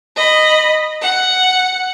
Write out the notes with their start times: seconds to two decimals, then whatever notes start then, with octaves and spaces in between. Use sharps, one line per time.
0.16 D#5 B5
1.02 F#5